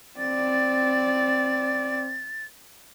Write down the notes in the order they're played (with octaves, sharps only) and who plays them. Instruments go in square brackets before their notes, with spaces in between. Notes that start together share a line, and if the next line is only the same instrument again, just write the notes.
[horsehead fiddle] C4 D5 [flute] A6